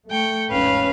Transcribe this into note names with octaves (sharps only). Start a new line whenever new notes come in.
A3 G5 C#6
G#1 E2 C#4 B4 F5